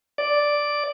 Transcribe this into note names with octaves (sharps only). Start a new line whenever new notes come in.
D5